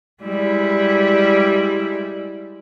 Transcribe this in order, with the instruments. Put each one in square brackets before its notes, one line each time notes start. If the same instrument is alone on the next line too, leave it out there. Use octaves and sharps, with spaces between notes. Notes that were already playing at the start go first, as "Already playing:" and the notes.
[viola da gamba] G3 G#3 E4